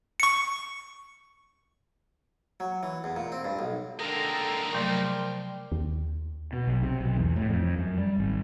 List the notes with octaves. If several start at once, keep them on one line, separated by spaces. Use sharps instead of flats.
C#6 C#7
F#3
E3
E2
A#2
C4
G2
B1
D3 G#3 A#3 A4 A#4 G5 A#5
C3 F3 F#3 A3 A#4 D5 G5 C6
D#2
B2
B1
C3
B1
E2
A2
F2
F#2
G3
G#1